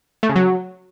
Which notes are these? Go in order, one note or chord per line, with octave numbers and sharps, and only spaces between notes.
A3
C#3
F#3